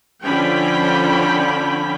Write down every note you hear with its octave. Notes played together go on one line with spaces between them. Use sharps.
D3 F3 C#4 G5 B5